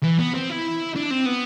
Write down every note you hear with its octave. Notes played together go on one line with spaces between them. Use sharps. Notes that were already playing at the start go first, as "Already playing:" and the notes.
E3
B3
C4
E4
D4
C4
B3